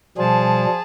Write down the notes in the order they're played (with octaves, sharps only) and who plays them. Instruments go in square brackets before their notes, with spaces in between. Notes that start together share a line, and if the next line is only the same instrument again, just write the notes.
[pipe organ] B2 G3 [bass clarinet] F3 [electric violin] G#4 A5